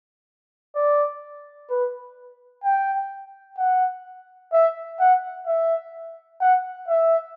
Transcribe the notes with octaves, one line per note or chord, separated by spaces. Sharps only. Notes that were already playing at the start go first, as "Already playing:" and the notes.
D5
B4
G5
F#5
E5
F#5
E5
F#5
E5